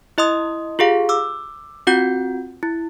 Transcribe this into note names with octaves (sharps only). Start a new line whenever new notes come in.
E4 D#5 C6 D#6
F4 G4 G#4 F5
D6 E6
C4 F4 F#4 F#5 G6
E4